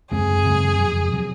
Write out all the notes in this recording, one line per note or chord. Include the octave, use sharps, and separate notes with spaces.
F#2 C#3 G#3 C4 G#4
F#2 C#3 G#3 C4
F2 C3 F#3
C3 F#3